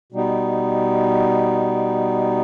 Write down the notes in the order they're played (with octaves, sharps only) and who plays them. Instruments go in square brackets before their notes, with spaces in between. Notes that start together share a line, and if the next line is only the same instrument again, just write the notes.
[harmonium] B2 G3 B3 D#4